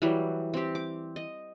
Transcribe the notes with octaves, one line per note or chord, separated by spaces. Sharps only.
E3 F#3 G3
C4 G4
D6
D#5